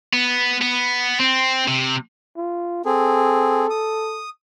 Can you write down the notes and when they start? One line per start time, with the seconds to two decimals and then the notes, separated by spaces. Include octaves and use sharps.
0.13 B3
0.61 B3
1.20 C4
1.68 C3
2.37 F4
2.85 C4 G#4 A4
3.70 D#6